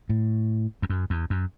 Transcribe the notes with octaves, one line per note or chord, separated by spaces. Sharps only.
A2
E2
F#2
E2
F#2